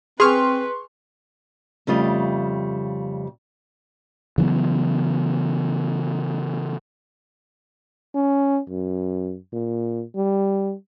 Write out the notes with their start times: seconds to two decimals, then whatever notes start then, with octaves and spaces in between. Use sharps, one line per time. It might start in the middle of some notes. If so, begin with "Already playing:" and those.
0.20 C4 G#4 B4 C6 C#6 F6
1.87 F2 C#3 G3 A3 F4 D#5
4.38 C#3 E3 F#3 B3
8.15 C#4
8.69 F#2
9.53 A#2
10.15 G3